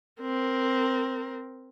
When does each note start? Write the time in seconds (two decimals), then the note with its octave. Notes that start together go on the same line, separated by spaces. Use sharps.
0.21 C4 A#4